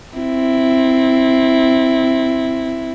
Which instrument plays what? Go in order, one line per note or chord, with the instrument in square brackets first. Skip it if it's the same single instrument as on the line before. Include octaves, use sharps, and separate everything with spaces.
[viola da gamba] C4 E4